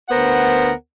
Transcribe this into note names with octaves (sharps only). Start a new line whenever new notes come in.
D2 B3 A#4 C5 F#5